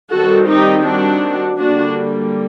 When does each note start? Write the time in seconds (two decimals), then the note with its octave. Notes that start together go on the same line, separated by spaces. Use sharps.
0.12 D#3 G3 C4 F#4 A4
0.49 D#4 G4
0.85 D4 F#4
1.58 D3 G3 A#3 D4 F#4